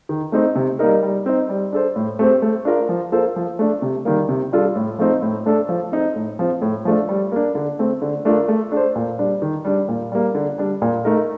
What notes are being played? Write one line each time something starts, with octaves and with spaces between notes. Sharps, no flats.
D#3
A3 C4 D#4
C3
G3 A#3 D#4 A#4
G3
C4 D#4
G3
D4 A4 C5
A2
A3 C4 G4 C5
A3
D4 F4 A#4
F3
A#3 F4 A4 C5
F3
A3 D4
C3
D#3 G3 A#3
C3
G3 D4 F4 A4
A2
F3 A3 C4 D#4
A2
A3 D4 A4
F3
C4 D#4
A2
F3 C4
A2
F3 A3 D4
G3
A#3 D4
D3
A3 C4
D3
A3 D4 F4 A#4
A3
D4 A4 C5
A#2
G3 D4
D#3
G3 D4
A#2
G3 A#3
D3
G3 D4
A#2
A3 D#4 A#4